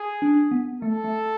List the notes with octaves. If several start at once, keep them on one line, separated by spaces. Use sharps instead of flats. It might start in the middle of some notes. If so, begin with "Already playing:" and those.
Already playing: G#4
D4
B3
A3 A4
A3